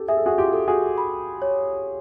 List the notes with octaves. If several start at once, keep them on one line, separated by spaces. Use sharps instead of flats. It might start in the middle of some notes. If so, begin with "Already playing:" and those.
Already playing: G4 A4
G#4 E5
A4
F#4 G#4
F4 G4
A4
F#4 G#4
B5
C#5